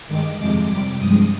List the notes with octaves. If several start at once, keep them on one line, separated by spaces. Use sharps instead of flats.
G2 D#3 G#3 D6
F2 C3 F3 G#3 D6
C3 G3 D6
G2 F3 G#3 D#6